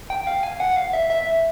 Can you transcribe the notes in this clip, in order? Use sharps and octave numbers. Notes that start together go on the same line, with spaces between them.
G5
F5
G#5
F#5
F5
E5
E5